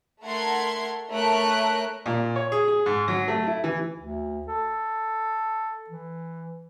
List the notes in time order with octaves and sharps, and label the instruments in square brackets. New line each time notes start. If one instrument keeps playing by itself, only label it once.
[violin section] A3 A4 A#4 F#5 C6 G#6
A3 A#4 C#5 F#6 D7
[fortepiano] A#2
C#5
G#4
G#4
G#2
F#3
A3
E4
E3
[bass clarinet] D2
A4
E3